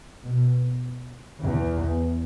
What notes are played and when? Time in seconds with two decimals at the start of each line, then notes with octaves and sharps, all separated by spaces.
0.21 B2
1.41 E2